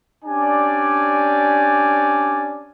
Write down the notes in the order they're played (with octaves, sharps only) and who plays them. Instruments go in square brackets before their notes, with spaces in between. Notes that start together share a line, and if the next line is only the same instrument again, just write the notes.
[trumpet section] C#4 D4 G4 D5 G#5